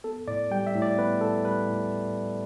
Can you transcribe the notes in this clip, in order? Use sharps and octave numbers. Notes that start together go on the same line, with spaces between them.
B3 A4
A2 D5
G3 G5
E5
A2
D5
B3 B4
A2 A4
G3 B4
A2